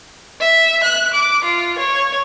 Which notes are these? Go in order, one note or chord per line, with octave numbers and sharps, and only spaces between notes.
E5
F#6
D6
F4
C#5